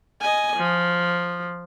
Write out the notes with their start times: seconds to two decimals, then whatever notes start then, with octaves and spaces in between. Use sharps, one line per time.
0.22 D#5 G#5
0.56 F3